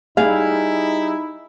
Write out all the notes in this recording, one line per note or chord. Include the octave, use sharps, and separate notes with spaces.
G3 D#4 E4 G#4 F5